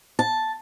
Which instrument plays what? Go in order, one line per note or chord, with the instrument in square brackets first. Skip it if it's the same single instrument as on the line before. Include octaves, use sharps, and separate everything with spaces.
[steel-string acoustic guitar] A5